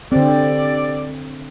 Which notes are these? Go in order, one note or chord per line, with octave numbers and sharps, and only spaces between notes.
D3 C4 G4 A4 D5